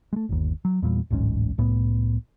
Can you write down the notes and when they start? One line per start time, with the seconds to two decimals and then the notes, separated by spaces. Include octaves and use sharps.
0.13 G#3 A3
0.29 G1 D#2
0.65 F#3
0.82 E2 A#2 G3
1.10 D1 A1 G#2 C#4
1.58 C2 A2 B3